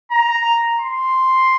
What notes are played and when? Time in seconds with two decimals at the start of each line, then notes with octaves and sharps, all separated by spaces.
0.12 A#5
0.80 C6